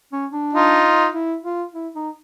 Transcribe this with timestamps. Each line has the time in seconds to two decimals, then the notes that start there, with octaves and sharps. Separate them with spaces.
0.12 C#4
0.33 D4
0.53 D#4 F4
1.14 E4
1.44 F4
1.74 E4
1.95 D#4